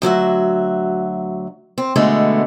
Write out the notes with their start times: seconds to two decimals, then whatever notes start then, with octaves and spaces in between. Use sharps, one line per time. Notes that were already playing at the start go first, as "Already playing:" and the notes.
0.02 D2 F#3 F#4 E5
1.78 C4
1.96 B2 D3 G#3 A3 B3